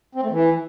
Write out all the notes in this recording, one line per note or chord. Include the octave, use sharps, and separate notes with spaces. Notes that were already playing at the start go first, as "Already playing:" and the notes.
C4
A3
E3